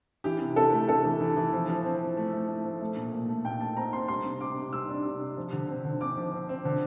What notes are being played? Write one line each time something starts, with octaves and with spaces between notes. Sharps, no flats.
E3 G4
C3
C3 A4
A3
C3 A4
E3
E3
E3
F3
F3
C4
C4
A3
A3
A3
F3
A3
A#2
A#2
A3
A#2 G5
A3 A5
C4 A#5
C4 C6
G3 C6
C3
C3 D6
C3
G3 E6
D4
C3
C3
F3
D3
C4
D3
C4 D6
F3
C4
C4
D3